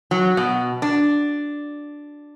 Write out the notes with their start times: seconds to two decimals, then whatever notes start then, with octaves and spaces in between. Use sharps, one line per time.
0.11 F#3
0.37 B2
0.82 D4